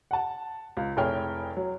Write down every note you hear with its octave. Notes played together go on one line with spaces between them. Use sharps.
F#5 A5
C#2
F1 E4 G#4 C#5 G5 F6
F#3